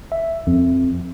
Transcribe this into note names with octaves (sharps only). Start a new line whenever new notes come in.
E5
F2